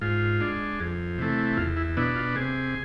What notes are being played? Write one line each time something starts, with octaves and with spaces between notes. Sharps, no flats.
G#2 F4
G#3 D4
F2
C3 E3 A3
E2 F4
E4
B2 B3 D4 E4
F4
C3 G#4